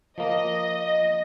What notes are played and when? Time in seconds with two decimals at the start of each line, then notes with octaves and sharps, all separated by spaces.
0.18 F3 A#3 D#5